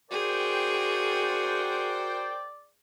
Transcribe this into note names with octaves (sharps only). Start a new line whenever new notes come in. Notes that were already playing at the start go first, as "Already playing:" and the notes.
F#4 G#4 A#4 C5 D5 G5